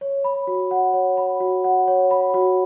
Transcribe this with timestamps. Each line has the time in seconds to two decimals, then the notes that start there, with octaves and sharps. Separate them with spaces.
0.01 C#5
0.24 B5
0.47 F#4
0.71 F#5
0.94 C#5
1.17 B5
1.40 F#4
1.64 F#5
1.88 C#5
2.11 B5
2.34 F#4